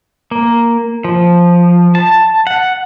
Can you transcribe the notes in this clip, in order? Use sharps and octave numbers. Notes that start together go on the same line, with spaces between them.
A#3
F3
A5
F#5